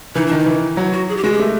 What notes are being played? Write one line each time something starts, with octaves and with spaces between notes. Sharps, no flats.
E3 D#4
D#3 D4
D#4
E3
F#3 E4
F#4
G#4
G4
G#3 F#4
G4
A3